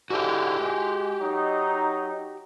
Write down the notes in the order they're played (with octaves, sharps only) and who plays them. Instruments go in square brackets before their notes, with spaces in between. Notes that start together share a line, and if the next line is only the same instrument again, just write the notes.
[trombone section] G#2 D3 E4 [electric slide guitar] F#4 G4
[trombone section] G#3
F#3 D#4